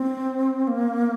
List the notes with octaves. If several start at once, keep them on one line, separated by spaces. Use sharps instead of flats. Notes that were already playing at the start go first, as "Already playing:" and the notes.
Already playing: C4
A#3